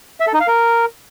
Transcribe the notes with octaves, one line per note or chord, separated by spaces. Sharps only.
E5
A4
D#4
F5
A#4